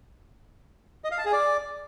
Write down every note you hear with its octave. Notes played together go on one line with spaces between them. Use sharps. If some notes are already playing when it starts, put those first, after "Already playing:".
D#5
F5
A5
G#4
D5